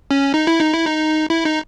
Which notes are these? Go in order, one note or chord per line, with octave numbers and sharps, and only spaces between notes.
C#4
D#4
E4
D#4
E4
D#4
E4
D#4